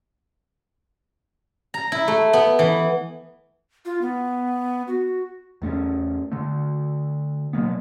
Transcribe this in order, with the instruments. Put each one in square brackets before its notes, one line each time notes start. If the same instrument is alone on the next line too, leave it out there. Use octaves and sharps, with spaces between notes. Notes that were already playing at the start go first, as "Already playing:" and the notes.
[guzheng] A#5
E4
A3
B3
E3
[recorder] F4
B3
F#4
[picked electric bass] E2 A3 B3 C#4
D3 A3
B2 F#3 A#3 B3